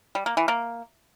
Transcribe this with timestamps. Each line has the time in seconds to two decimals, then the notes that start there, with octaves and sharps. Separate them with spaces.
0.15 G3
0.26 A#3
0.37 E3
0.48 A#3